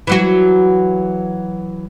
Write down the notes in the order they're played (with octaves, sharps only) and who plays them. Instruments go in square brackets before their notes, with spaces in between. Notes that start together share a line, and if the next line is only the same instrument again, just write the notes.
[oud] E3 F#3 F#4